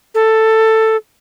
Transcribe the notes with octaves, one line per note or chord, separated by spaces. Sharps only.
A4